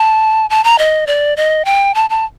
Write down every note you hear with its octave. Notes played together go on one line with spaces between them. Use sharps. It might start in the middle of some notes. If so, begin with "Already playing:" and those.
Already playing: A5
A5
A#5
D#5
D5
D#5
G5
A5
A5